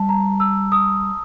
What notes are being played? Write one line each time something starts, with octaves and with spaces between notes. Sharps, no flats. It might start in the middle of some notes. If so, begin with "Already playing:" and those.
Already playing: G3 A5
A#5
E6
D#6